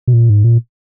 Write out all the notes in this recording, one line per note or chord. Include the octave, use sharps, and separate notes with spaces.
B2
A#2
G#2
A#2